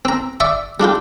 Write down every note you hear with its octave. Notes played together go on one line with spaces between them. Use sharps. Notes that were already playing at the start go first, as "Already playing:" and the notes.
C4 A#5
D5 E5 C#6 D#6
G3 D4 F4 G4